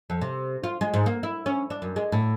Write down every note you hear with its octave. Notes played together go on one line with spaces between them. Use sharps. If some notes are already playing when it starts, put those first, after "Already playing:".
F2
C3
F4
G#3
G#2
A#3
E4
C#4
D4
F#2
G#3
A2